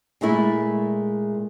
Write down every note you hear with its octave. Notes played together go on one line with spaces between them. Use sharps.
A#2 G#3 A3 E4